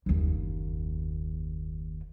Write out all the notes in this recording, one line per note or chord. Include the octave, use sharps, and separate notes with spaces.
F#1 D#2